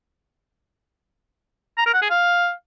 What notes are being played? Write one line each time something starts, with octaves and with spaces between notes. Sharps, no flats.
A#5
A#4
F#5
G#4
F5